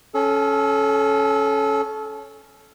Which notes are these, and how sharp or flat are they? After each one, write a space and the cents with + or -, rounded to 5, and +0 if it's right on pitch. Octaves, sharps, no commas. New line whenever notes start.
C#4 +0 A4 -25 G#5 +35